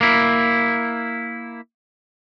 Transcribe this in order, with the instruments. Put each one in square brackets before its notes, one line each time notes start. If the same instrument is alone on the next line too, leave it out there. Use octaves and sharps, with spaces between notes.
[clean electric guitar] A#3 E4